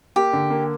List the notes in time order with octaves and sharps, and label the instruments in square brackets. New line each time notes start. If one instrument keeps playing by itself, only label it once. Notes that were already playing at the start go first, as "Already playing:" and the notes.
[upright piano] A#3 [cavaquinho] G4
[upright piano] D3
A#3